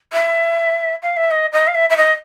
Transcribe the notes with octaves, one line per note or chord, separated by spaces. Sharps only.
E5
F5
E5
D#5
D#5
F5
E5
E5
D#5